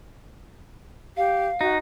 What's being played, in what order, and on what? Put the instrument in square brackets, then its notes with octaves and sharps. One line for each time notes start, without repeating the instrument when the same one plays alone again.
[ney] G4 [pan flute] F5
[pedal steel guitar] D#4 [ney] F#4